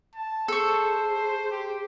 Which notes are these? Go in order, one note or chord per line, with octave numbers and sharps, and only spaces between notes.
A5
G#4 A4 C5 C#6
G4